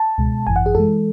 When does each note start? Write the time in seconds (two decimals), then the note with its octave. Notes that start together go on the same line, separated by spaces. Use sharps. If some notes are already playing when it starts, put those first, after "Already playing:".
Already playing: A5
0.18 C#2 B2 G#3
0.47 G#1 F#2 E3 G#5
0.56 F#5
0.66 G#4
0.75 F#2 E3 G#3 A4